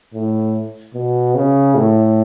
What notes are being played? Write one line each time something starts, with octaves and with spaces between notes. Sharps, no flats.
A2
B2
C#3
A2